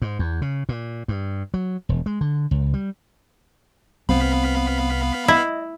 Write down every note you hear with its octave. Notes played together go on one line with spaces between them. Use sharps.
G#2
E2
C#3
A#2
G2
F#3
E1
G#3
D3
C#2
G3
C2 B3 C4 F5 B5
E4 D#5